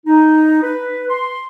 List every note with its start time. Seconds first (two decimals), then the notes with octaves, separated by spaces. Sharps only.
0.06 D#4
0.62 B4
1.10 C6